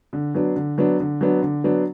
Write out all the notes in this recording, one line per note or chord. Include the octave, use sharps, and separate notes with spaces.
D3
F#3 B3 D4
D3
F#3 B3 D4
D3
F#3 B3 D4
D3
F#3 B3 D4